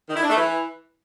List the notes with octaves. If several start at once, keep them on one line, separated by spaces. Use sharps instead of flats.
D#3
E4
D4
A3
E3